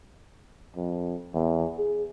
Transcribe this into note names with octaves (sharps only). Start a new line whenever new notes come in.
F2
E2
G#4